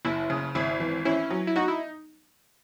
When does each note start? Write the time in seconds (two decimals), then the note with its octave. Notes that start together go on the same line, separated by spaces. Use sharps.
0.05 F#1 E4
0.30 C#3
0.55 G#1 E4
0.80 E3
1.05 C#4 E4
1.30 F#3
1.47 E4
1.56 D#4 F#4
1.68 E4